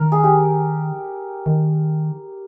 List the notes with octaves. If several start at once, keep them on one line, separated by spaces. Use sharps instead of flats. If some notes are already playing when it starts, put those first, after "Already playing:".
Already playing: D#3 A#4
G#4
G4
D#3